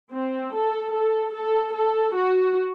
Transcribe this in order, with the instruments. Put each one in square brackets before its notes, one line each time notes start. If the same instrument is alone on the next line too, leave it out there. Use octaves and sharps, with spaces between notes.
[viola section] C4
A4
A4
A4
A4
F#4